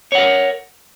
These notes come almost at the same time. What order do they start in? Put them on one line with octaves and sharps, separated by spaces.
C#5 F#5 A#4